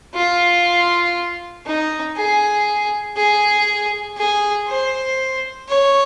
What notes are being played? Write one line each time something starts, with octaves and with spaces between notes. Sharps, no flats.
F4
D#4
G#4
G#4
G#4
C5
C#5